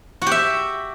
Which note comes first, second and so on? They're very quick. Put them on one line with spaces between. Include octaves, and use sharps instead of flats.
F#4 G4 E5